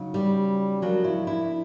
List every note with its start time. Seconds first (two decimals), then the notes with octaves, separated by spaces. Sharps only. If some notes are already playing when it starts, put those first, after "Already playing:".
Already playing: C#3 F#3 D#4
0.14 G3 G4
0.82 F3 F#3 A#3 D4 F#4
1.04 E4
1.27 E4